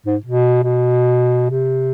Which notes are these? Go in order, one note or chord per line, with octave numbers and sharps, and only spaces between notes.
G#2
B2
B2
C3